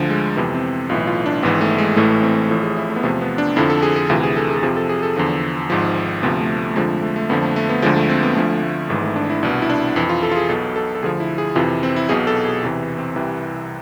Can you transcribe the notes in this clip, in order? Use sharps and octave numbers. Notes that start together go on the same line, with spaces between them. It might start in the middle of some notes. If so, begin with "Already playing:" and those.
Already playing: D2 D3 F3
G#3
F2 C3 E3 B3
C4
B1 A2 E3 F4
F4
D4
G#1 G#2 E3 B3
A3
G#3
A1 A2 E3 A3
C4
A1 A2 F3 A4
G#4
E4
A3
B3
E2 C3 F3 A3
B3
D4
F2 D3 F3 E4
A4
G#4
G#4
D2 C3 E3 F4
G#4
A4
G#4
A4
F2 C3 F3 G#4
A4
G#4
A4
E2 D3 F3
G#1 G#2 F3
D2 C3 F3 B3
A3
A3
A3
F2 D3 F3 G#3
A3
A3
A3
F2 D3 F3 B3
A3
A3
B3
D2 D3 F3 G#3
A3
C4
B3
D2 D3 F3 A3
A3
G#1 G#2 E3 A3
A3
D4
E4
C2 B2 D4
E4
D4
F2 E3 E4
F4
A4
F4
G#4
B1 B2 A4
A4
A4
D2 D3 F3 G#4
E4
G#4
F2 C3 E3 F4
C4
E4
B1 B2 G#4
A4
G#4
E2 C3 E3
C4
C2 C3 E3